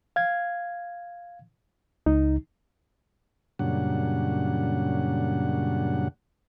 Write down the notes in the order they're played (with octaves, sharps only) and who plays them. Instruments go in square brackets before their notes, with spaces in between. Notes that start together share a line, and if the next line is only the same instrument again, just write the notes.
[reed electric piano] F5 G#6
[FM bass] C#2 [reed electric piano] D#4
[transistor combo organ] F#2 A#2 C#3 G3 D4 F#5